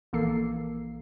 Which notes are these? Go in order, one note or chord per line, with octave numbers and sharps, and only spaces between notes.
A#1 E3 A#3 A4 C7